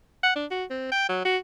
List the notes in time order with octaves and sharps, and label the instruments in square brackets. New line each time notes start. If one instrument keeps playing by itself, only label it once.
[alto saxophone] F#5
D4
F#4
C4
G5
F#3
F#4